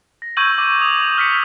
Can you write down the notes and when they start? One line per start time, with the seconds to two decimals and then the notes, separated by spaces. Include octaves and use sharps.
0.22 A#6
0.37 C#6 E6 G6 G#6 D#7 F#7
0.57 D6 G6
0.80 D6 D#6 F7
1.18 F6 B6 C#7